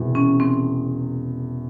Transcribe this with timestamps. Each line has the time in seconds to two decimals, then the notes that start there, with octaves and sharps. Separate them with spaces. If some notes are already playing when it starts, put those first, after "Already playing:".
Already playing: E1 E2 C3
0.15 C#4
0.40 C4